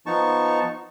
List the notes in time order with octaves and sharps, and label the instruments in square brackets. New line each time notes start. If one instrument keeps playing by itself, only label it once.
[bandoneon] F3 B3 D#4 A5 C#6